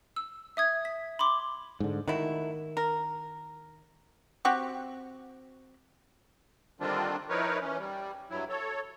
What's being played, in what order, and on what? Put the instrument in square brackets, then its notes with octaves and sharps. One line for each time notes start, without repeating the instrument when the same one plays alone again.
[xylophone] E6
E5 D#6 G#6
B6
B5 C6 D6
[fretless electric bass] G#2 D3
[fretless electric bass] D#3 [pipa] F#3 A3 E4
[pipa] A#4
C4 F#4 G4
[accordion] D3 D#3 G3 C4 D4 F4
F3 D#4 E4 A#4 B4 C#5
E3 C#4
G3
G2 F#3 E4
A4 C#5